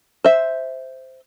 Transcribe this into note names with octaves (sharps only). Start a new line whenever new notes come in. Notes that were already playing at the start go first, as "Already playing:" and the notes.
C5 E5